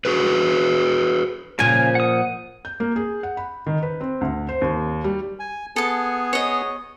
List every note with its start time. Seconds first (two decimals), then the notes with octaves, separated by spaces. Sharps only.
0.05 F#4 G#4 B4
1.59 A#2 C#3 F3 G#5
1.95 F#5 D#6
2.65 G6
2.80 A#3
2.96 G#4
3.23 F#5
3.37 B5
3.66 D#3
3.83 B4
4.01 C4
4.21 D2
4.49 C5
4.62 D#2
5.04 G3
5.39 G#5
5.76 B3 G#4 A4 G#5 A5
6.33 C#5 D#5